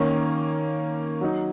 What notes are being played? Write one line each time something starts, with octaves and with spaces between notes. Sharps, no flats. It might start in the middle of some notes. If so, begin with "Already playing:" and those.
Already playing: D#3 A#3 C#4
F#3 D#4